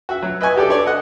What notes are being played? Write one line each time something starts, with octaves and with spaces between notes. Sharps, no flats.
F#4 E5
F#3
B4 D#5 E5 G#5 C#6
F#4 G4 A4 D5
D4 C#5 D5
A4 D#5 F#5